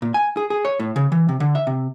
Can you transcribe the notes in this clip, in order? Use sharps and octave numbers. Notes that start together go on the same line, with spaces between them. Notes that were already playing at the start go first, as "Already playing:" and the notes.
A#2
G#5
G#4
G#4
C#5
A2
C#3
E3
C3
D3
E5
C3